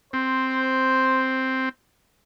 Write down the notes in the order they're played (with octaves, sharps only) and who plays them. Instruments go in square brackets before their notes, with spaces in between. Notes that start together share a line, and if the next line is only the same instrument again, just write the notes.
[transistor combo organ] C4 [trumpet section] C5